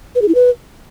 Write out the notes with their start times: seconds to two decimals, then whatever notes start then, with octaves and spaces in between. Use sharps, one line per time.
0.15 B4
0.22 G#4
0.28 E4
0.35 B4